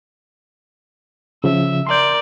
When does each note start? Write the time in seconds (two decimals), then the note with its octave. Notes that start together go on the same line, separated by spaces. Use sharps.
1.44 C#3 F3 E5
1.87 A#4 D5 C6 G6